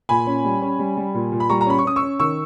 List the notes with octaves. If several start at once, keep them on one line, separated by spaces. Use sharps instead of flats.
A#2 G#5 B5
C#4
G3
C#4
G3
G3
A#2
A#2
B5
G3 A#5 C#6
A#5
C#4 B5
C#6
C#4 D#6
C#6 E6
C#4
D#3 C#6 E6